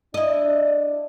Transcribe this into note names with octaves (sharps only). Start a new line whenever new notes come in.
D4 E4 D5 D#5